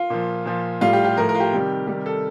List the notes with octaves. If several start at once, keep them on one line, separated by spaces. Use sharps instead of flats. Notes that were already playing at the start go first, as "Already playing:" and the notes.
Already playing: F4
A#2 F3
A#2 F3
A2 G3 F4
G4
G4
A2 F3 A#4
A#4
F4
G4
C3 D#3 G3
C3 D#3 G3 G4
A4